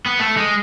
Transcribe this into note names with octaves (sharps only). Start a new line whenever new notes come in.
B3
A3
G#3